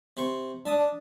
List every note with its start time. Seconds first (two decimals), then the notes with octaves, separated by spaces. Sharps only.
0.17 C3 C5 C#6
0.66 D4 E5 A5 D#6